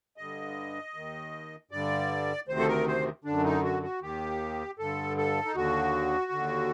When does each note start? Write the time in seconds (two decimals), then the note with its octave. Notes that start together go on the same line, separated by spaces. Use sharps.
0.17 G2 D3 D#5
0.94 D#2 D#3
1.71 G2 D3 D5
2.48 D2 C3 D#3 C5
2.59 A4
2.68 A#4
2.87 C5
3.24 F#2 D3 D4
3.44 D#4
3.63 F#4
3.83 F#4
4.02 D#2 D#3 G4
4.79 G2 D3 A4
5.17 A4
5.45 D#4
5.55 D#2 D3 F#4
6.32 D#2 D3